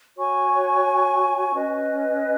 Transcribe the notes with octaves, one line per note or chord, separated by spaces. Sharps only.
F#4 C#5 G#5 C#6
C#4 B4 D#5